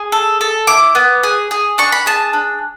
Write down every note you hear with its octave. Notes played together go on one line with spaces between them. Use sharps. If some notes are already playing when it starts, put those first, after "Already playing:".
Already playing: G#4
A4
A4
E4 D6
B3
G#4
G#4
D4 C#6
B5
G#4 A5
D4